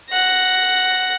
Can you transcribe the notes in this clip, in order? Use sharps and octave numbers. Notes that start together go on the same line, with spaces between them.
F#5 A#6